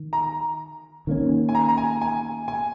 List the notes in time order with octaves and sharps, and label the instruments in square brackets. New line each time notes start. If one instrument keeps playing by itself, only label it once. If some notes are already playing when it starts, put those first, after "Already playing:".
Already playing: [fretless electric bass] D#3
[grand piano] A#5
[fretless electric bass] D#3 A#3 C#4
[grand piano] G#5
A#5
A#5
G#5
G#5
G#5